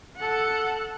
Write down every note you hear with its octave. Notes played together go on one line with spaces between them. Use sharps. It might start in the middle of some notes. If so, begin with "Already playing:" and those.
A4 F#5